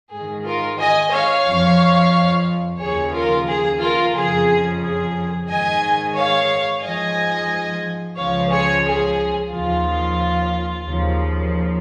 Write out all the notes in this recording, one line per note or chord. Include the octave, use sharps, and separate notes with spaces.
G#2 D#3 G#4
F4 A#4
D#5 G#5
C#5 F5
F2 F3
D#2 C#3 F3 G#4 C#5
F4 A#4
G#4
F4 A#4
F2 C#3 F3 G#4
G#4
G#2 D#3 D#5 G#5
C#5 F5
G#2 F3 D#5 G#5
C#2 C#3 F3 C#5 F5
G#4 C#5
G#4
D#2 C#3 F3 F4
D#2 C#3 F3